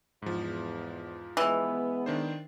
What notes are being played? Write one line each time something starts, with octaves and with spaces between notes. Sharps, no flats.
E2 G#2 F3
E3 G#3 B3
D#3 D4 C5